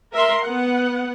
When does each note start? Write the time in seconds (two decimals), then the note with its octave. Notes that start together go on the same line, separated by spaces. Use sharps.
0.13 A#4 E5 C6
0.44 B3 F#5